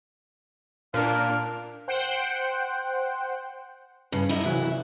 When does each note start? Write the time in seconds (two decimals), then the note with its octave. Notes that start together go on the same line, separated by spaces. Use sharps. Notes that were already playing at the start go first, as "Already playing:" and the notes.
0.94 A#2 D4 A#4 F5
1.88 C5 F#5 G5
4.12 G2 C#3
4.29 F#2 D#4 E4
4.44 C3 E3 F#3 E4